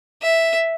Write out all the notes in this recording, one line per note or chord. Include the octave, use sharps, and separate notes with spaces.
E5